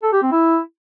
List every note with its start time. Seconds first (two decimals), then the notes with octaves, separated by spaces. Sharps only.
0.03 A4
0.13 G4
0.22 C4
0.32 E4